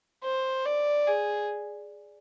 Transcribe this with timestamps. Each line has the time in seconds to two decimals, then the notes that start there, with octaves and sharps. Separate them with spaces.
0.24 C5
0.65 D5
1.07 G#4